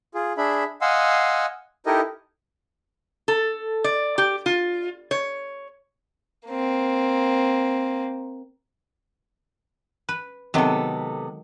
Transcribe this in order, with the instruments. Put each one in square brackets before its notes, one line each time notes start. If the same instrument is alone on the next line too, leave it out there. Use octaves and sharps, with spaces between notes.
[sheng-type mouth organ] F4 G#4
D4 G#4 E5 B5
D#5 F5 F#5 G#5 C6 E6
D#4 E4 G4 A4 A#4 D#5
[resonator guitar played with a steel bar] A4
D5
G4
F4
C#5
[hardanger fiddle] A#3 C4
[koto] B4
[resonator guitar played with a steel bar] C3 B3 A4 [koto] D#3 F#3 G#3